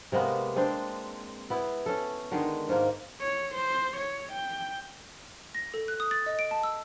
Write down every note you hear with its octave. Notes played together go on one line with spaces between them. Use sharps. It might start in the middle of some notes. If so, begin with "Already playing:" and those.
C3 G#3 A#3 B3
G#3 C4 D4 C5
B3 E4
C#4 A4
D3 D#3 G#3
G#2 A#3
C#5
C5
C#5
G5
A#6
A4
F#6
D#6
A6
D#5
D7
A5
E6